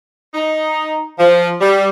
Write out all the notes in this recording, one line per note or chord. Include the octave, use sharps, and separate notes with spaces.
D#4
F3
G3